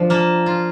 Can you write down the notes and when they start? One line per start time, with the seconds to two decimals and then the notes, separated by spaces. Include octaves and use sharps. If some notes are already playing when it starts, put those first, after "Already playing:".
Already playing: F3 D4
0.10 A#3 A5
0.46 F4